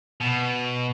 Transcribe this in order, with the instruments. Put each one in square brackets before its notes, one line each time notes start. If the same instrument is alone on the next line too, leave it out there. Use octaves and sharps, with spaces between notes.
[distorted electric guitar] B2